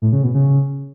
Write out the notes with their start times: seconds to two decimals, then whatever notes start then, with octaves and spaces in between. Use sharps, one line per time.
0.02 A2
0.13 C#3
0.23 B2
0.34 C#3